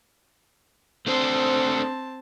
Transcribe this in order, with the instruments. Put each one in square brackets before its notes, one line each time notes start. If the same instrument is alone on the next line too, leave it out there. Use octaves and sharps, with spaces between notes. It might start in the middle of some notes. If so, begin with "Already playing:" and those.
[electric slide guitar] A3 D4 C5 [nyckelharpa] C4 A5